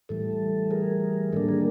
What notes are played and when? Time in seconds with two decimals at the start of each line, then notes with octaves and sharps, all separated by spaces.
0.09 A2 E3 G3 A4
0.71 G#4 A#4
1.33 D#3 G3 A#3 D4 A4
1.49 G#4 A#4